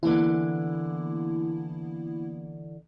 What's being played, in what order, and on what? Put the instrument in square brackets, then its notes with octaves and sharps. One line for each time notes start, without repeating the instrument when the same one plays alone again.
[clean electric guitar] D3 E3 [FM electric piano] A#3 B3 E4